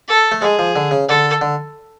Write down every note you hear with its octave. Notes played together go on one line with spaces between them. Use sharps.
A4
A3
G#3 G#4
F3
D3
C#3
D3 A4
D3